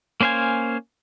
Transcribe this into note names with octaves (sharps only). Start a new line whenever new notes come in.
A#3 C#4 C5 F5 G#5